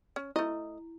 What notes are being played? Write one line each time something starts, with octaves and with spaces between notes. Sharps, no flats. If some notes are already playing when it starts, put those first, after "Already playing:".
C#4
A3 E4 D#5